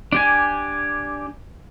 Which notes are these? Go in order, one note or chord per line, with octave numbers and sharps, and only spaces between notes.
D4 G4 G#5